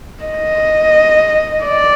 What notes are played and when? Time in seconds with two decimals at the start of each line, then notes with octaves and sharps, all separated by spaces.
0.23 D#5
1.63 D5